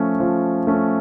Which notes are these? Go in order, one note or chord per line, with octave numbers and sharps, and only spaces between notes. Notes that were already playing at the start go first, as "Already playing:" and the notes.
Already playing: F3 A3 C#4
F3
A3 C#4